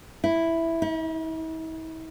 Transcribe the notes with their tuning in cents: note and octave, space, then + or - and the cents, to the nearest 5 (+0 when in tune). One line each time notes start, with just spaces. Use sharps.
E4 +0
E4 -45